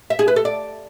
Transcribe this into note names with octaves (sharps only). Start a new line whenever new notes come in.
E5
G#4
B4
A4
D5